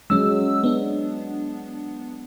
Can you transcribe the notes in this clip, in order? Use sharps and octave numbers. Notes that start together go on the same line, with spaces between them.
F#3 G#3 C#4 E6
B3 D4